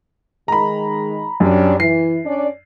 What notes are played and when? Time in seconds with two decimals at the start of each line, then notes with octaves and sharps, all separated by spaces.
0.48 D#3 G#3 A#5 B5
1.40 F#2 G3 C#4 D4
1.80 E3 C7
2.25 C#4 D4 D5